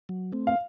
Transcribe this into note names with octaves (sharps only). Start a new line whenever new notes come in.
F#3
A3 C4
F5